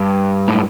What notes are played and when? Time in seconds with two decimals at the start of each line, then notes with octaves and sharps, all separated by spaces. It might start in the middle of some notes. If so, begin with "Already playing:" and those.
Already playing: G2
0.48 A2